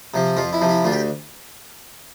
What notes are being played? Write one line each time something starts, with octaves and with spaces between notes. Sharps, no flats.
C3 F3
F2 F4
E4
C3 F3
E4
D2 F4
G4